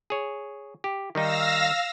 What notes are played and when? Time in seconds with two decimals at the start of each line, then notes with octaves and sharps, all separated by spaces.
0.10 G#4 C#5
0.84 G4
1.15 D#3 G3 D#4 F5 E6 A#6